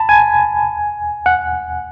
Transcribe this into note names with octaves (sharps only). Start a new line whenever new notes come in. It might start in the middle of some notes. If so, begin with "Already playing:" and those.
Already playing: A5 B5
G#5
F#5